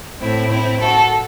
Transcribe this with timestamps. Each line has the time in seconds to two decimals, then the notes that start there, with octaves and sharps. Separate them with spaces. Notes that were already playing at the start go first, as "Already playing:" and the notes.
0.21 A2 C4 E4
0.51 C4 E4
0.80 F#4 A4